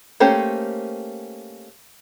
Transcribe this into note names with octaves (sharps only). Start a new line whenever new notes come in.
A3 A#3 C#4 G4 C5